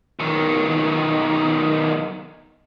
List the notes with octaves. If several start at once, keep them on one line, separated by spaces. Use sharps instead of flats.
B1 D#3